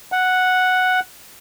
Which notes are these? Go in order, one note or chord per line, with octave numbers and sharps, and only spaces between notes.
F#5